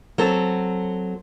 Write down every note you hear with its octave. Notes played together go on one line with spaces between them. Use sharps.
F#3 C4 A4